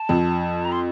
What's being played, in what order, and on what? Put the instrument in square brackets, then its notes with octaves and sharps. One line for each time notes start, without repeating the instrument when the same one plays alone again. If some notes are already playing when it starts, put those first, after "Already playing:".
Already playing: [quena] A5
[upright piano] F2
[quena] A#5
C6